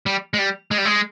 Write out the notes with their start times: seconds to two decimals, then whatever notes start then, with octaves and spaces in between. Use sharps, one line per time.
0.06 G3
0.34 G#3
0.39 G3
0.71 G#3
0.78 G3
0.85 G#3